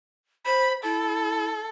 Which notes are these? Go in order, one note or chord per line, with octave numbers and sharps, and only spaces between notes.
C5 B5
E4 A4